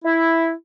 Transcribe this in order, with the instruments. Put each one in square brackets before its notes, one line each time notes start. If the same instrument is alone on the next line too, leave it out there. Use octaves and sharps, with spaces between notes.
[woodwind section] E4